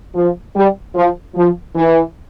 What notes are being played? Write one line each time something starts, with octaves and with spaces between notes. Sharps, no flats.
F3
G3
F3
F3
E3